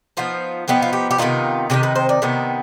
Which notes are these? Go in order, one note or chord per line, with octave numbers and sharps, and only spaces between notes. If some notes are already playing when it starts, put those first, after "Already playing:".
F3 B3 D#4 F4
F3 B3 D#4 G4
F4
G4
G4
C3 D#3 B3 D#4 F4
C3 D#3 B3 D#4 G4
B4
C5
D5
C3 D#3 B3 D#4